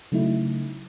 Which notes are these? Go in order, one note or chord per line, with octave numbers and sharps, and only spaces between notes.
C#3 F#3 A3 D#4 E4